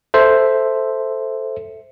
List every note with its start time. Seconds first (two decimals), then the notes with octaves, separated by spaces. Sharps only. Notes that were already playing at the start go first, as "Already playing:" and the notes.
0.14 A4 C5 E5